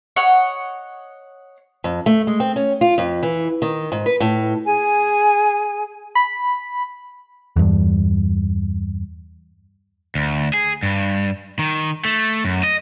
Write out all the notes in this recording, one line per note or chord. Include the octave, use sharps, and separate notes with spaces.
C#5 D#5 F#5 C#6
F2
A3
G#3
C4
C#4
F4
F2
E3
D#3
G#2
B4
A2
G#4 G#5
B5
E2 G2
D2
G#4
G2
D#3
A3
F#2
D#5